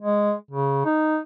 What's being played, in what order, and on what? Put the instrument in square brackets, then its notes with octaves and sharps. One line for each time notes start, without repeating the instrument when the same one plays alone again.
[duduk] G#3
C#3
D#4